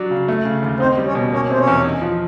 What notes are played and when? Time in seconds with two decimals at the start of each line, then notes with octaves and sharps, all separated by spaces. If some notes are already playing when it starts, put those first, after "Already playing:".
Already playing: F#3 D4
0.11 C#3
0.28 A3
0.45 C#3
0.62 D#2
0.80 C4 D#4 C5
0.97 G3
1.06 C#4 C#5
1.15 B2
1.32 A#3 C#4 C#5
1.50 C3 C5
1.58 C#4 C#5
1.67 E2
1.84 D#4
2.02 F3